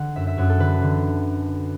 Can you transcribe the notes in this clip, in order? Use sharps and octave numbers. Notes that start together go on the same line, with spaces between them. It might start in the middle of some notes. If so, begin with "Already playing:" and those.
Already playing: D3 F#5
F#2 E5
E5
F#2 F#4
A4
D3 B4
D3